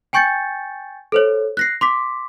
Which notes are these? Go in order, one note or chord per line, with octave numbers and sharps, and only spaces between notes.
G5 G#5 C#6 G6 A6 C#7
A4 C5 C#5
F#6 A#6 C7
C6 D6 B6